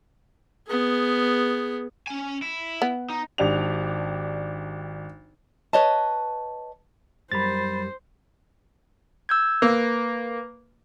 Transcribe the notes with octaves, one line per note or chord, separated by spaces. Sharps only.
B3 G#4
C#4 G#5
E4
B3
D#4
G#1 D4 G4 F7
B4 C#5 D#5 A5
F#2 G3 A#4 C5 B5 A6
E6 G6 G#6
A#3 B4